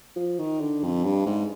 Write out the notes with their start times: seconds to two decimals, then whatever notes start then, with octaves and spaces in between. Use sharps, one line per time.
0.16 F3
0.39 D#3
0.61 D3
0.83 F2
1.04 G2
1.26 G#2